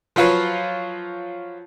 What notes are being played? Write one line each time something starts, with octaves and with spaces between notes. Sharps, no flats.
F3 F#3 F4 B4 C#5